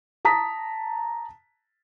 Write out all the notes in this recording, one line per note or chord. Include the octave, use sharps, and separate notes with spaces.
A5 A#5 D#6 B6